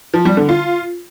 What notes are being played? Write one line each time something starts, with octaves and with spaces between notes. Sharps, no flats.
F3
G3
D3
F4